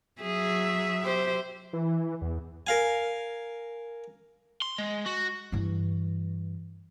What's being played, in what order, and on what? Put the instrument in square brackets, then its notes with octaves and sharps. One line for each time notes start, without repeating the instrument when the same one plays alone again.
[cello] F#3 E5 [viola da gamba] G#4
[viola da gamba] G4 C5
[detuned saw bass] E3
E2
[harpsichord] A#4 F5 G#5
[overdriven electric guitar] C6
G#3
F#4
[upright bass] G2 E3